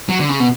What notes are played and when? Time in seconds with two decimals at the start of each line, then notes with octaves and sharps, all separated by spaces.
0.09 F#3
0.19 D3
0.29 C#3
0.40 B2